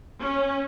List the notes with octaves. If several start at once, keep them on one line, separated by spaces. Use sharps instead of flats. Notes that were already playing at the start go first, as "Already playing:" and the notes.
C#4